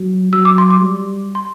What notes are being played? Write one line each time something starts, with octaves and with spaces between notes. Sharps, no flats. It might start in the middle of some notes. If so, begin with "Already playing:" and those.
Already playing: F#3
F#3 E6
D6
C6
D6
G3
C6